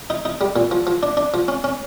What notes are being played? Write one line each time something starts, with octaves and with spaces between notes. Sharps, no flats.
D#4
D#4
G3
A#2
F3
F3
D4
D4
F3
C#4
C#4